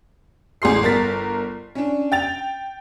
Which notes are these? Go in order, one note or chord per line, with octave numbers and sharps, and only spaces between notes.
A1 G#4 C6 C7
G1 A#4 A6 B6
C#4 D4
G5 A6 F7